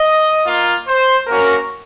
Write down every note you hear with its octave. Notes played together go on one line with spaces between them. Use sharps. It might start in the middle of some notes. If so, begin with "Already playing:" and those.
Already playing: D#5
A#3 F4
C5
A#3 C#4 F#4 A#4